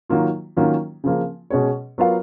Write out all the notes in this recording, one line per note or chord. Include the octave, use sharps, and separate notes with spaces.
D#3 F#3 A#3 F4
D#3 F#3 A#3 C#4 F4
C#3 F3 A#3
B2 G#3 C#4 G#4 C#5
F#3 B3 F4 A#4 F5